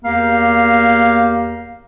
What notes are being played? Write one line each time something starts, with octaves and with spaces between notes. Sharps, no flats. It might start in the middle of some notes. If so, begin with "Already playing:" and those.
E2 A#3 G4 F5